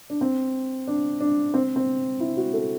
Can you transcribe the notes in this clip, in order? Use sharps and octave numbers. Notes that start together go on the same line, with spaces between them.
D4
C4
D4
D4
C4
C4
E4
F#4
A4